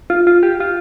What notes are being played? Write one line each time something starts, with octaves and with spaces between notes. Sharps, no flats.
F4
F4
G4
F4